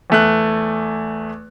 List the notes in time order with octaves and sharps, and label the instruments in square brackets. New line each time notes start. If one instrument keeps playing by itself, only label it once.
[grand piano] E2 A3 F#6